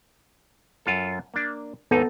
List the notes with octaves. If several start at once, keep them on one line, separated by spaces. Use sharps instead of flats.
F#2 F4 A4
A#3 D4
D#2 G#2 B3 D#4 A4